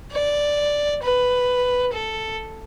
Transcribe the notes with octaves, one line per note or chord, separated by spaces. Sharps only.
D5
B4
A4